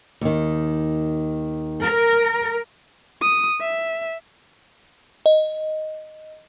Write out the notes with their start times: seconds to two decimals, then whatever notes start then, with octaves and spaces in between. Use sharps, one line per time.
0.21 D#2 D#3
1.82 A#4
3.21 D#6
3.61 E5
5.26 D#5